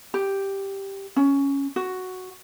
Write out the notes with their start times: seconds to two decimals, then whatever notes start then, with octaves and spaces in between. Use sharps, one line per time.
0.14 G4
1.16 C#4
1.76 F#4